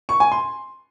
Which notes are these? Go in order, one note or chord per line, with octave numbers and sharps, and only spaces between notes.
C#6
G#5
C6